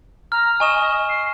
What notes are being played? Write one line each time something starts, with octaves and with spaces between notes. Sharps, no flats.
A#5 F6
D#5 G#5 C#6 E7
C7